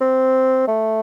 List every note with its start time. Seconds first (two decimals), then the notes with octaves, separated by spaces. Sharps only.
0.01 C4
0.68 A3